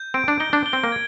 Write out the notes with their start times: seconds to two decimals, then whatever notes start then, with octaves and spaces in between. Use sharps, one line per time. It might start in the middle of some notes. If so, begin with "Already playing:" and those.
Already playing: G6
0.14 C4 D7
0.28 D4
0.40 D#4 G7
0.53 D4
0.66 G7
0.73 C4
0.84 A#3
0.92 G#6